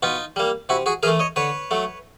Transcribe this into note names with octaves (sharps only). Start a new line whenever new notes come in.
B2 D#4 F4
G3 A#3
C3 E4 F#4
F#4 G#4
E3 A3 G#4 A#4
C#5 D#5
D3 B4 C#5
F#3 A3